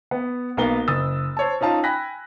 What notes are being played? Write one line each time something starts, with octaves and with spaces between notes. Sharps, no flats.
B3
B1 A#3 B3 G7
F#1 D#6 E6 A6
C5 C#5 A5
C#4 D#4 F4 A5
G5 G#5 B5 F#6 A#6 B6